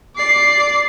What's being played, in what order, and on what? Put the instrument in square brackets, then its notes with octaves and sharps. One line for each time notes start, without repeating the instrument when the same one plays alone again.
[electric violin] D5 C7